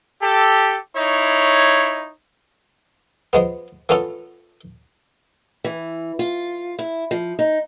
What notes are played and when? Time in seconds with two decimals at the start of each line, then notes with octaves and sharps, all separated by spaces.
0.22 G4 A4
0.96 D#4 E4 C#5
3.33 F3 G#3 B3
3.89 E3 A3 B3 C#4 F4 A4
5.64 E3
6.19 F4
6.79 E4
7.11 F3
7.39 D#4